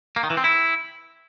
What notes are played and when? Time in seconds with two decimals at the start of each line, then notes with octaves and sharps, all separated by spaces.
0.16 A#3
0.23 D#3
0.30 E3
0.37 C4
0.44 E4